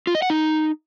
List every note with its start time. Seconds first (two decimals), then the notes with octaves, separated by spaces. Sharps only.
0.07 F4
0.15 D#5
0.22 F#5
0.30 D#4